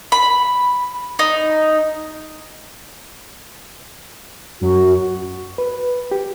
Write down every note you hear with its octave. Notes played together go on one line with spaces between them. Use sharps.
B5
D#4
F#2 F#4
B4
G4